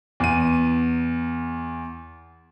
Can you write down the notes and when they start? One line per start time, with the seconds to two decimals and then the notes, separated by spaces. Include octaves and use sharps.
0.20 E2 D#7